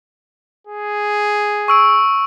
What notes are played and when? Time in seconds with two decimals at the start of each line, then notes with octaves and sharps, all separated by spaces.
0.67 G#4
1.68 C#6 E6 D7